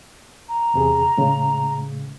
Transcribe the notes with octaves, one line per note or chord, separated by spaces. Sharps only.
A#5
E2 C3 G#4
A2 C#3 G#3